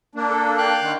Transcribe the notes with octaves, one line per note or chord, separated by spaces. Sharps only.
A#3 D4
A4
F5 G5 F#6
D3 D#3